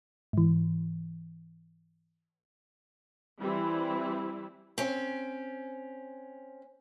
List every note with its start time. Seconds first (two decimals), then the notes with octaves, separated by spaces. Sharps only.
0.33 G#2 E3
3.40 E3 G3 C4 E4
4.78 C4 C#4